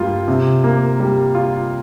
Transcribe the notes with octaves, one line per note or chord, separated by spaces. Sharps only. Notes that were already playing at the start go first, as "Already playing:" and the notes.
Already playing: G2 G3 A#3 F4
C3
A#3
G3
F4